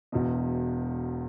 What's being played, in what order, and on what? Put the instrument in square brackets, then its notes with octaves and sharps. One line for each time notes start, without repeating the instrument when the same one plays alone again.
[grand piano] E1 E2 B2